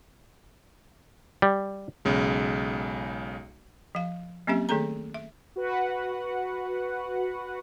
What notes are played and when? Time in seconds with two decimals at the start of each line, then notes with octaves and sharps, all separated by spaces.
1.42 G3
2.05 B1 C#3 G#3
3.95 F3 F5
4.47 F#3 A#3 C4 C#4 G4 E5
4.69 D#3 A3 G#4 A4 A#5
5.14 E5
5.56 F#4 B4 F#5